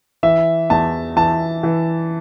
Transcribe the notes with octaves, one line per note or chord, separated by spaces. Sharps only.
E3 E5
E2 A5
E3 A5
E3